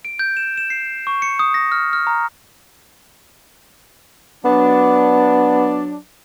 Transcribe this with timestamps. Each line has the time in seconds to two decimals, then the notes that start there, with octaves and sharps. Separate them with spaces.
0.05 D7
0.19 G6
0.37 E7
0.57 E7
0.70 C7
1.07 C#6
1.22 C#7
1.39 D#6
1.54 A#6
1.72 F6
1.93 F6
2.07 A#5
4.45 F#3 B3 D4